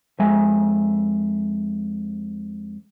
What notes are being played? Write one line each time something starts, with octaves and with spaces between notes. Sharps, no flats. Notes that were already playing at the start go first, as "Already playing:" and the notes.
F2 G#3 E5 G#5